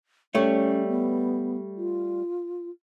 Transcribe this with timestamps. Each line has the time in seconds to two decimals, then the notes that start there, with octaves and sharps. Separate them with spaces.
0.35 G3 A3 C#4 C#5
0.88 B3
1.77 F4